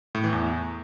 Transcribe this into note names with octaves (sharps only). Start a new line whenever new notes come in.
A2
E3
E2